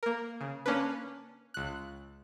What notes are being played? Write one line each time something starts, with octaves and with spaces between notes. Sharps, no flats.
A#3 A#4
C#3
A#3 C#4 D4 B4
C#2 F#6